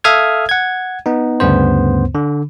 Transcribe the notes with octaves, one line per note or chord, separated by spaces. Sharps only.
A4 E5 F5 D#6 F6 G#6
F#5 G#6
B3 D#4
D2 G2 C#3 B3 C5
D3